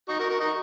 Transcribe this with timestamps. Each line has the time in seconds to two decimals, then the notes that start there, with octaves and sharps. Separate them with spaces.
0.09 D#4 F#4
0.19 F#4 A#4
0.30 F#4 A#4
0.40 D#4 F#4